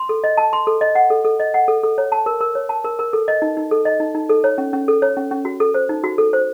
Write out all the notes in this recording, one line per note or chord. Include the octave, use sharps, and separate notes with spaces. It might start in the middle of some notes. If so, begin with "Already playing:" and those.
Already playing: C6
A4
D#5
A5
C6
A4
D#5
F#5
A4
A4
D#5
F#5
A4
A4
C#5
A5
A#4
A#4
C#5
A5
A#4
A#4
A4
D#5
D#4
D#4
A4
D#5
D#4
D#4
A4
C#5
C#4
C#4
A4
C#5
C#4
C#4
F#4
A4
C5
D#4
F#4
A4
C5